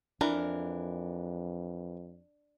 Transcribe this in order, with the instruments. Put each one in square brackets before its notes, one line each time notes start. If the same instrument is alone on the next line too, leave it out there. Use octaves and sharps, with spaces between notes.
[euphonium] F2 [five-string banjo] E3 A#4 [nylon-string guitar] D4